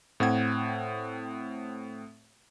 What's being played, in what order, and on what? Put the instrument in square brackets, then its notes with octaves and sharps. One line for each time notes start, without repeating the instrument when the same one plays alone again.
[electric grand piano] A2 C4 F#5 G#6